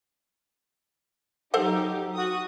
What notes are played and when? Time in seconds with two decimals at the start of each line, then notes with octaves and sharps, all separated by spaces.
1.54 F#3 D#4 G4 A4 C5 F#5
2.15 F#4 D#6